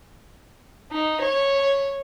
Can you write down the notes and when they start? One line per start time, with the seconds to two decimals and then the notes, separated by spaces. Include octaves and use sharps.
0.92 D#4
1.21 C#5